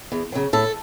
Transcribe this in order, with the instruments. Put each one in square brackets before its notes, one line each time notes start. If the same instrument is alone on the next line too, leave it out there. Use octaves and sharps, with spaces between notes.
[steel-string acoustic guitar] E2
C#3 F#3
A2 A4